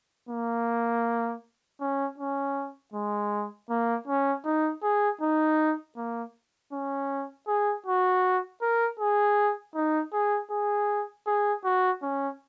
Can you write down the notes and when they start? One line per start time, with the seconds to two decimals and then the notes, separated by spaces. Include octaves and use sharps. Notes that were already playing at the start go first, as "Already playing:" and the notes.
0.29 A#3
1.81 C#4
2.18 C#4
2.94 G#3
3.70 A#3
4.08 C#4
4.45 D#4
4.83 G#4
5.21 D#4
5.97 A#3
6.73 C#4
7.48 G#4
7.86 F#4
8.62 A#4
9.00 G#4
9.75 D#4
10.13 G#4
10.51 G#4
11.27 G#4
11.65 F#4
12.02 C#4